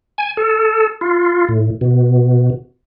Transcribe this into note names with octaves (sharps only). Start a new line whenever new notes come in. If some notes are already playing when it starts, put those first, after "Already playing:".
G#5
A4
F4
A2
B2